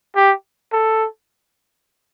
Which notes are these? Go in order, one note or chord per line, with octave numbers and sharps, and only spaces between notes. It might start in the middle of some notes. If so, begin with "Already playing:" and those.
G4
A4